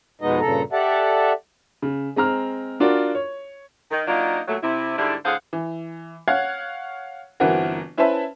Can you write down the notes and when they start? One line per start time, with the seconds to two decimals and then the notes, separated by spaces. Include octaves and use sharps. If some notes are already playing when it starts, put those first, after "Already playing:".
0.21 F2 B2 G#3 B3 D#4 D#5
0.41 G2 A#2 C#3 A4 A#5
0.72 G4 A4 D5 E5 F#5 A5
1.82 C#3
2.16 G#3 C4 A#5 F6
2.80 D4 F4 F#4 A#4 D5
3.15 C#5
3.91 D#3
4.08 F#3 A#3 D4 D#4 F4
4.48 A#2 F#3 A3
4.63 C3 E4
4.97 G#2 D3 G3 D4 E4
5.25 A2 D3 G#4 C5 F5 F#5
5.53 E3
6.28 C#5 F5 F#5 F#6 G#6
7.40 G1 E3 C4 F#4 A#4
7.98 C#4 E4 B4 C5 E5 A5